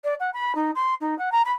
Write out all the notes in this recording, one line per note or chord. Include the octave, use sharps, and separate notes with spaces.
D5
F#5
B5
D#4
C6
D#4
F#5
A#5
B5